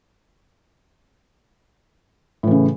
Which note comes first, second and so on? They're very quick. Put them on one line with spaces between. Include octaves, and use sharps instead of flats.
A2 E3 C#3